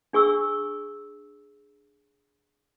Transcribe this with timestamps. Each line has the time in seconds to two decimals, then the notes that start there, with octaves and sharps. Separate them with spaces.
0.13 D4 G#4 C#6 E6